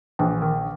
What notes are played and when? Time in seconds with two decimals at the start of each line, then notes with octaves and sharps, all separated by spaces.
0.19 A#1 E3
0.42 D#3